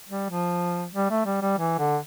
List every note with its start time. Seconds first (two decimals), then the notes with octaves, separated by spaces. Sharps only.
0.09 G3
0.30 F3
0.94 G3
1.10 A3
1.26 G3
1.42 G3
1.58 E3
1.78 D3